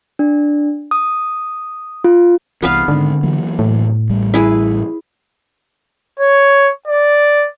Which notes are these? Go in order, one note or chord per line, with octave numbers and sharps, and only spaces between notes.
D4
D#6
F4
C2 E3 B3 B4 F5
G#2 D3 D#3
E3 F#3 A#3
A2
A1 G3
E4 G#4 B4
C#5
D5